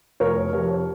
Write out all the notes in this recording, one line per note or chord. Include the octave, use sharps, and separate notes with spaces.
F1 A#4 C#5
F2 C3 A#4 C#5